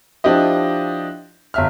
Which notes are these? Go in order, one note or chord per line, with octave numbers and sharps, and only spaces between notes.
F3 D4 E4 G4 D#5
G1 E5 F6